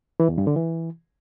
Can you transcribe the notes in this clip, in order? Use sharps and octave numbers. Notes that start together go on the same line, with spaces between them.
E3
E2
G2
D3
E3